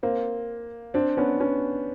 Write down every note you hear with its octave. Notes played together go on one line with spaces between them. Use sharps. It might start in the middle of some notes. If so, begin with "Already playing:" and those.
A#3 C4
C4 D4
B3 C#4
B3 C#4